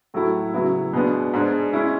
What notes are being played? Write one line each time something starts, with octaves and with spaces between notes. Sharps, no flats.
A2 F#3 A3 E4
C#3 F#3 B3 E4
B2 G#3 B3 D4
G#2 G#3 D4
G#3 C#4 E4